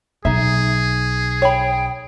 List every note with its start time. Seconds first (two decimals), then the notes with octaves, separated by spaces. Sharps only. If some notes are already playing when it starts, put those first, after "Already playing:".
0.25 B1 D#4 G#4 E5
1.42 C#5 G5 B5